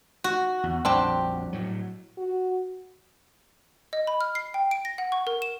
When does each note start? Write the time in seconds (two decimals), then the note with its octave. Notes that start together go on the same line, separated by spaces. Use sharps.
0.24 F#4
0.63 E2
0.85 A#1 F2 G3 C4 D4 G4
1.53 A2 F#3
2.17 F#4
3.93 D#5
4.07 B5
4.21 F6
4.35 C7
4.54 G5
4.71 D7
4.85 A#6
4.98 F#5
5.12 C#6
5.27 A#4
5.42 E7